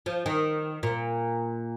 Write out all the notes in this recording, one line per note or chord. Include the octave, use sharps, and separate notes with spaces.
F3
D#3
A#2